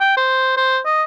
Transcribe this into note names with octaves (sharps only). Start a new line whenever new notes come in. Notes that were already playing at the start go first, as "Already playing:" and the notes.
G5
C5
C5
D#5